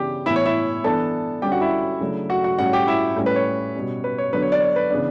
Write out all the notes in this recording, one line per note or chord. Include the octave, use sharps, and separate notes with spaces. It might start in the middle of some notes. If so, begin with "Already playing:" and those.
Already playing: C#3 E3 B3 D4 G4 G5
A2 E3 B3 E4 E5
C#5
E4 E5
E3 B3 D4 A4 A5
D3 G3 C#4 G4 G5
F#4 F#5
E4 E5
C#3 F#3 A3 D4
F#4 F#5
F#4 F#5
A2 G3 C#4 F#4 F#5
G4 G5
E4 E5
A2 G3 C#4
B4
C#5
B2 G3 C#4
B4
C#5
D3 F#3 B3 D4 B4
C#5
D4 D5
C#5
B4
C#3 E3 B3 D4